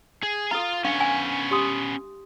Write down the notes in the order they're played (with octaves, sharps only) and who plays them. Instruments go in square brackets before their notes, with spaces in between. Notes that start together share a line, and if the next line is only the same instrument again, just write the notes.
[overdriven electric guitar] G#4
[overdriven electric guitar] F4 F5 [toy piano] A4 A#5
[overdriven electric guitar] B3 C#4 [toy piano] D4 F5 C#6
[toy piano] G#5
G4 C6 D#6